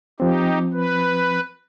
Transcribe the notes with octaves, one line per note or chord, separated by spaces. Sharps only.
F3 C4 D#4 G4
B4